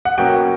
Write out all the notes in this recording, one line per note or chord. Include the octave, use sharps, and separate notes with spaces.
F#5
B2 F#3 A#3 C#4 G5